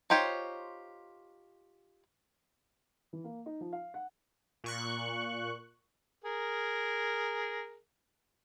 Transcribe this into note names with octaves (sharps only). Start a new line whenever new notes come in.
D#4 F4 G4 C5 C#5
E3
A#3
D#4
F3
F5
F#5
A#2 C#6 F#6
G#4 A#4